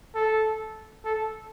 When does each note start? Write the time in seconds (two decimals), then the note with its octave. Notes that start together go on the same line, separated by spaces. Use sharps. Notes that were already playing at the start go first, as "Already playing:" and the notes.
0.15 A4
1.05 A4